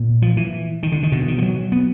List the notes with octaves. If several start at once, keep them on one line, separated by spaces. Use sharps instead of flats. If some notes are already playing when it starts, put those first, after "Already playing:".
Already playing: A#2
F3
E3
D#3
D3
D#3
B2 D3
D#3
F3
F#3
B3